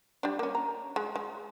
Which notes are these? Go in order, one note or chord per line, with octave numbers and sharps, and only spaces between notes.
G3 D4
A#3 C#4
A#5
G#3
G#3